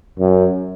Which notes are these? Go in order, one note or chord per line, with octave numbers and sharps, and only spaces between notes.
F#2